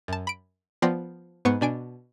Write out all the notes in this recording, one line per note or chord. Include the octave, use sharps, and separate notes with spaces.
F#2 A5
B5 D7
F3 B3 D5 G5 C6 A#6
G#2 B3 C#6
B2 D4 G#5 D7